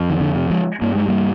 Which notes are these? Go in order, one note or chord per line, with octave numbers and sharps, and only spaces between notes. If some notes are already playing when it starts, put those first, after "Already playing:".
Already playing: F2
D#3
D3
C3
F3 G#3
G2 A#3
G#3
G3 A#3